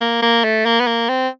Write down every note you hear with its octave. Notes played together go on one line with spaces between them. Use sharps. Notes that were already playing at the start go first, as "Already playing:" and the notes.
A#3
A#3
A3
A#3
B3
A#3
C4